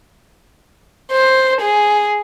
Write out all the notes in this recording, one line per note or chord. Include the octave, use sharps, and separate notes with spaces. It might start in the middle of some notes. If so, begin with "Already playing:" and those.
C5
G#4